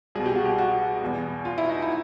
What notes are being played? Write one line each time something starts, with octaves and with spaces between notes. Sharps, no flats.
C2 B2 G#4
G4
F#4
G4
F#4
E2 B2
F4
E4
D#4
E4